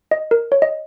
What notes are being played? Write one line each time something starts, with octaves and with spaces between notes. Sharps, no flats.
D#5
A#4
C#5
D#5